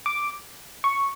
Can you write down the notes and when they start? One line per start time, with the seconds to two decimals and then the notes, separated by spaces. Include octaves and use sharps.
0.06 D6
0.84 C#6